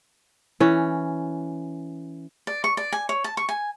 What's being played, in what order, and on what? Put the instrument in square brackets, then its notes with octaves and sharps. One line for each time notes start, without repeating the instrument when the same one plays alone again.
[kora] E3 C#4
[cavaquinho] D5
C#6
D5
G#5
C#5
A5
C#6
G#5